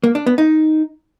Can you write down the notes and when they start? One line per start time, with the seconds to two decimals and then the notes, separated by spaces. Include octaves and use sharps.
0.04 A#3
0.15 D4
0.26 B3
0.38 D#4